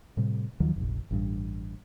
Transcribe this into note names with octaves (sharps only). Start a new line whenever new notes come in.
A2 C3 G3
D#2 D#3 F3 F#3
F1 A#1
A1 G2